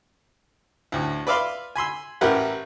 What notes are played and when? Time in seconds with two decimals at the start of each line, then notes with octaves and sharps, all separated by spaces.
0.92 D2 A2
1.27 B4 D5 E5 F5 B5 C6
1.76 G#5 B5 C6 E6
2.21 A1 E4 G4 A#4 B4 F#5